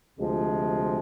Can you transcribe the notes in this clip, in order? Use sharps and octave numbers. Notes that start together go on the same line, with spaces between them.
D2 C3 F3 G#3